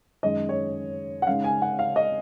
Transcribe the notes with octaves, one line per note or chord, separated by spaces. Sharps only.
F#2 D#3 G#3 D#5
C#5
F#5
C#3 G#3 D#4 F5
G#5
F#5
F5
D#5